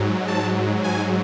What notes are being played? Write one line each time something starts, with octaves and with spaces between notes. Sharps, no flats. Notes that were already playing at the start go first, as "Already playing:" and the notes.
Already playing: G#2 F#3
A5
G#5